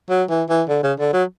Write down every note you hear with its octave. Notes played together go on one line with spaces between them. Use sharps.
F#3
E3
E3
D3
C#3
D3
F#3